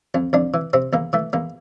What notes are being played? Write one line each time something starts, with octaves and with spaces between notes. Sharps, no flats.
F2
F2 D4
E3
C3 C4
E2 A#3
E3 A3
E2 A#3